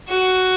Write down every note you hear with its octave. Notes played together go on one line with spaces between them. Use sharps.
F#4